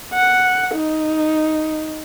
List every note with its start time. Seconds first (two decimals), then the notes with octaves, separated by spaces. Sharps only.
0.13 F#5
0.75 D#4